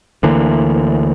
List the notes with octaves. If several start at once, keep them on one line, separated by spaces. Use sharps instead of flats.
D2 D3 E3 A#3